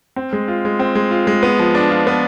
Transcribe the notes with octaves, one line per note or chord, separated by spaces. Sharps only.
C4
G#3
F4
G#3
C4
G#3
F4
G#3
B3
F3
D4
F4
B3